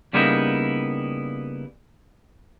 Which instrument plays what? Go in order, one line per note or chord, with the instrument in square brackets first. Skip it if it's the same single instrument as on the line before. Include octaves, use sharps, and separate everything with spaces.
[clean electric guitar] C#3 G3 A#3 B3 D#4 E4